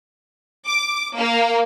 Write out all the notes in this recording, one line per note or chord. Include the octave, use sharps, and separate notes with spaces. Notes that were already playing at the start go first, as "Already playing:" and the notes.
D6
A#3